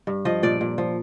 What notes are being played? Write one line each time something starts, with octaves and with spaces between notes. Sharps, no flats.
G2
F3 D#5
A#2 D5
A#2
F3